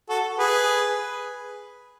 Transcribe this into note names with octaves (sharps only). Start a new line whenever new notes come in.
F#4 A4
G#4 B4